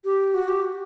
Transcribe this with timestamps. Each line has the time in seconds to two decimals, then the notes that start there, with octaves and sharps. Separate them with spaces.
0.05 G4
0.34 F#4
0.48 G4